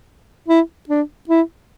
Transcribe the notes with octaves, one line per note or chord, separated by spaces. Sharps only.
E4
D4
E4